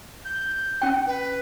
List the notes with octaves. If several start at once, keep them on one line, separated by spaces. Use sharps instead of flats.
G6
C#4 G5
B4